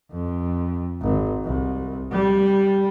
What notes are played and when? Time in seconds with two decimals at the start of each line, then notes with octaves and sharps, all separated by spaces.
0.11 F2
1.02 G#1
1.45 C2
2.12 G3